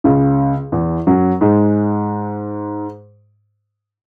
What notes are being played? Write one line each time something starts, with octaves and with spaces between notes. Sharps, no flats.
C#2 C#3
E2 E3
F#2 F#3
G#2 G#3